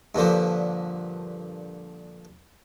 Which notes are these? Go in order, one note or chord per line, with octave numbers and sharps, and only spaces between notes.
G2 A#2 D3 F3